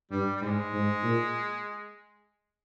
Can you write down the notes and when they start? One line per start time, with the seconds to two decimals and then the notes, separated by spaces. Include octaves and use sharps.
0.11 G2 G3
0.36 G3
0.42 G#2 G#3
0.74 G#2
1.03 A#2